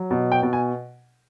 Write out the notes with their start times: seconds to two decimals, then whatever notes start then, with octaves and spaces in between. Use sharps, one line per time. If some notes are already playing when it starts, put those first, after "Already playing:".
Already playing: F#3
0.11 B2
0.32 G5
0.43 B2
0.53 G#5